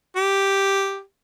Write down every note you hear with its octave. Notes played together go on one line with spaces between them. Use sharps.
G4